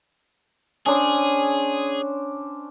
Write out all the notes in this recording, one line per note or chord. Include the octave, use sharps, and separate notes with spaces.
C#4 D4 G#4 C5